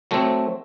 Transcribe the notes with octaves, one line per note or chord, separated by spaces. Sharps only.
F#3 A3 C4